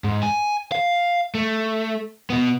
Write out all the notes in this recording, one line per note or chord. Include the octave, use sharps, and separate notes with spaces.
G#2
G#5
F5
A3
B2 B3